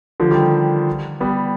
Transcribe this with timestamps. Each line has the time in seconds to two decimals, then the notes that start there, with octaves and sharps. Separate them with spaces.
0.20 D3 F3
0.31 D#3 G3
1.20 G3 B3